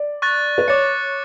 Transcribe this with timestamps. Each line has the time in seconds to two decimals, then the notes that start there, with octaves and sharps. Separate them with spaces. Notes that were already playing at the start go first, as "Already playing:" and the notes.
Already playing: D5
0.22 C#6 F#6 A6
0.58 B4
0.68 C#5 D6 A6 C#7